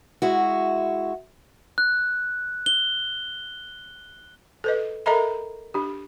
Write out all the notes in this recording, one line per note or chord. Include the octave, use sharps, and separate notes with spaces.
G#3 E4 F#4
F#6
G7
A4 B4 D#5
A4 A#4 D#5 E5 A#5 B5
D4 G4